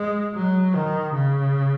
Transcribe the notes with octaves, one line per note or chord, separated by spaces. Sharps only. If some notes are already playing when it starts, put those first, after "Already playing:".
Already playing: G#3
F#3
D#3
C#3